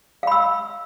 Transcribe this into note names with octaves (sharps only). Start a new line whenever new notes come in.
F5 B5 E6